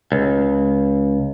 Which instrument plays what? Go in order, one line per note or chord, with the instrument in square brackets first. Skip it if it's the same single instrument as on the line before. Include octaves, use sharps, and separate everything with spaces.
[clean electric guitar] C#2